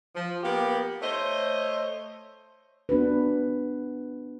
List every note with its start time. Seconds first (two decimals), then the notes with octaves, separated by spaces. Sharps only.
0.15 F3
0.43 A#3 B3 G4
1.02 A3 C5 C#5 D#5
2.89 B3 D4 F#4 B4